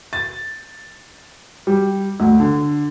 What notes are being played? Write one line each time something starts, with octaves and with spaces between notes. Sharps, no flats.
A6
G3
D2
D3